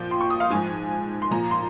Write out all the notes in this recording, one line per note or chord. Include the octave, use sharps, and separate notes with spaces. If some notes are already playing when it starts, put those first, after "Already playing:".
Already playing: A#2 F3 G5
C6
C#6
D#6
F5
G#2 F3 G#5
C6
A#2 F3 A#5
C6